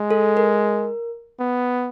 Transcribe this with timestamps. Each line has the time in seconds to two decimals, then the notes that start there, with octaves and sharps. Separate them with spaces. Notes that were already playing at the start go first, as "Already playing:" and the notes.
Already playing: G#3
0.11 A4
0.37 A#4
1.40 B3